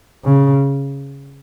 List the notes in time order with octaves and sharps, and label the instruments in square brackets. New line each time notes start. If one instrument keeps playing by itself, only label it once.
[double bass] C#3